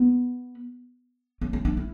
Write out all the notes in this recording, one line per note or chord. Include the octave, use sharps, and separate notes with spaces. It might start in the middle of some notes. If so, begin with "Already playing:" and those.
Already playing: B3
C#4
C#4
D4
E4